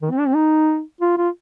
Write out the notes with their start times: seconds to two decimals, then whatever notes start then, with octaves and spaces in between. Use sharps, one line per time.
0.02 D#3
0.11 C4
0.19 D4
0.27 C4
0.35 D#4
1.01 F4
1.18 F4